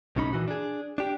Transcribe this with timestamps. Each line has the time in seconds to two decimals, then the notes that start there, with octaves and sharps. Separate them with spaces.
0.16 B1 A2 C#4 D#4 B5
0.33 A#2 E3 F#4
0.48 D4 G#4
0.98 D4 G4